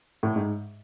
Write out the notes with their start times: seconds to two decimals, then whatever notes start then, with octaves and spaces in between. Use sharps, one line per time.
0.23 A2
0.36 G#2